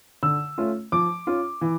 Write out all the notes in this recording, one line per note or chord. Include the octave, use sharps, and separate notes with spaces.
D3 E6
A3 C#4 F4
F3 D6
C#4 F4
E3